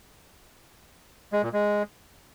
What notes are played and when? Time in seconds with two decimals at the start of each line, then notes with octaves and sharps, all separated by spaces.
1.33 G#3
1.43 A#2
1.53 G#3